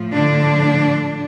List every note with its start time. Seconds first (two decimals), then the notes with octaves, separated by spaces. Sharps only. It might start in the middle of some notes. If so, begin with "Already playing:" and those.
Already playing: A2 F3
0.13 D3 D4